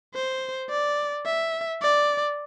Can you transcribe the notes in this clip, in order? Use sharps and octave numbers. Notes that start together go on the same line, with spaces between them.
C5
D5
E5
D5